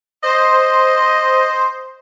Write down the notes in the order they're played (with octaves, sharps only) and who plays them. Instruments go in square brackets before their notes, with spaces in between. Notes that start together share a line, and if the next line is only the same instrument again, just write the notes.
[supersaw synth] C5 [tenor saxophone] D#5